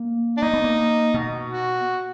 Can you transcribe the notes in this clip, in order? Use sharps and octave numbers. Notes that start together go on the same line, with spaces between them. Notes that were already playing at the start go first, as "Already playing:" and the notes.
Already playing: A#3
D4
A#3 D#4
B3
A#3
B2
F#4